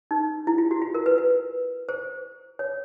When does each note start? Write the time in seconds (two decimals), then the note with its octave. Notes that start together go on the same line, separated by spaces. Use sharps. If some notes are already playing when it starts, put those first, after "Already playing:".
0.11 D#4
0.47 E4
0.58 F4
0.71 F#4
0.82 F4
0.94 A#4
1.06 B4
1.18 B4
1.89 C5
2.59 C#5